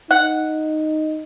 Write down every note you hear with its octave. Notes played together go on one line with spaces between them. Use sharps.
D#4 F#5